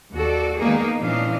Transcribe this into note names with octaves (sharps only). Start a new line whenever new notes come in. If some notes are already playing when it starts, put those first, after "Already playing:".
D#2 F#4 A4 D5
D#3 G#3 A#3 B3 D#4 G#4
A#2 E3 C#4 D4 D#5 F5